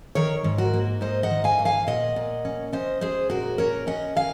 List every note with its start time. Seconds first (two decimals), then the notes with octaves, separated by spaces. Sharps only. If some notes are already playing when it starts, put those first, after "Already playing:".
0.15 D#3 A#4 C#5
0.44 G#2
0.58 F#4 A#4
0.74 A#3
1.01 G#2 C5 D#5
1.23 D#5 F#5
1.30 D#3
1.44 F5 G#5
1.59 G#2
1.65 F5 G#5
1.87 A#2 D#5 F#5
2.16 A#2
2.45 C#4
2.73 C#4 C5 D#5
3.01 G#3 G#4 C5
3.30 A#2 F#4 A#4
3.58 C#4 A#4 C#5
3.87 C#4 D#5 F#5
4.15 D#3 F5 G#5